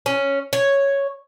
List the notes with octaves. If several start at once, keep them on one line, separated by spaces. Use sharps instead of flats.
C#4
C#5